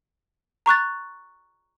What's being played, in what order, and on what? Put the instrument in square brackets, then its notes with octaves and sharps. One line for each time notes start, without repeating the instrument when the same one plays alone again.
[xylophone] A#5 C#6 F#6 A6